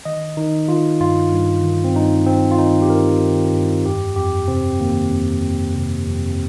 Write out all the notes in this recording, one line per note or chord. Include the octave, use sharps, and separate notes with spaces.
D#3 D#5
D#3 D#4
D#3 F4
G2 F4
G2
D#3
C4
G2 D#4
G2 C4
F4
D#3 D#4
G4
G2 A#4
D#3
G2
F2 G4
F2 G4
C3 C4
D#3 A#3
F2
F2
C3
F2